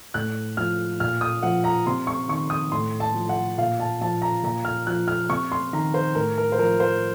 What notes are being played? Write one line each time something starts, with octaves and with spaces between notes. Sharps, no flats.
A2 F#6
F3 F6
A#2 F6
D#6
F3 F#5
A#5
C3 C6
C#6
D#3 C#6
D#6
A2 C6
A5
F3
F#5
A#2 F5
A5
F3 A5
A#5
A#2 A#5
F6
F3 F#6
F6
C3 C#6
C6
D#3 A#5
C5
A2 A#4
A#4
C5
F3 A#4
C5